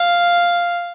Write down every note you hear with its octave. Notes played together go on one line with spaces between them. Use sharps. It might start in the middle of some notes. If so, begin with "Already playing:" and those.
Already playing: F5